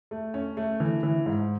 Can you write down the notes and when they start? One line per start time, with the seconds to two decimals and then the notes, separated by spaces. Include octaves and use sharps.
0.11 A3
0.34 C#4
0.57 A3
0.80 E3
1.03 E3
1.26 G#2